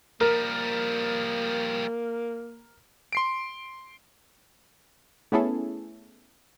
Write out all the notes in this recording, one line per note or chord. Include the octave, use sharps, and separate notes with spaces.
F3 G3 A#3 A#4
C6 C7 D7
A3 B3 C#4 E4 G#4 A4